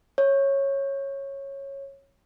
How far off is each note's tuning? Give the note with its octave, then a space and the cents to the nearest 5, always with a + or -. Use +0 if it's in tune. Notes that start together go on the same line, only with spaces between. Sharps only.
C#5 -10